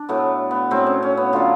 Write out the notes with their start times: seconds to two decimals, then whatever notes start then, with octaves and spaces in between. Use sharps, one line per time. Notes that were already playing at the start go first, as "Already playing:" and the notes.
Already playing: D4
0.09 A2 F#3 A3 B3
0.51 B3
0.71 A2 F#3 A3 C4
0.87 C#4
1.03 C#4
1.17 B3
1.33 D3 F#3 A3 F4